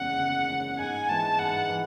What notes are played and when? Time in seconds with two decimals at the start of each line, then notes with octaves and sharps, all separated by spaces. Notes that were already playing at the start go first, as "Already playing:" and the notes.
Already playing: F#1 E2 C#3 G#3 C#4 F#5
0.18 F#1
0.48 E2 C#3 G#3 C#4
0.79 G#2 G#5
1.09 E3 G#3 B3 E4 A5
1.39 G#2 F#5
1.69 E3